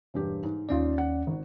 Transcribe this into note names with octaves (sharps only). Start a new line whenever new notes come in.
E1 G2 G4
G#2
D#2 C#4 D#4 F4 D5
F#5
G#1